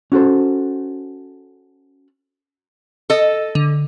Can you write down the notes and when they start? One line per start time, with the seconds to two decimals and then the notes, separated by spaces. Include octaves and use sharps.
0.12 C#4 F#4 A4 C5
3.10 A4 D#5
3.55 D3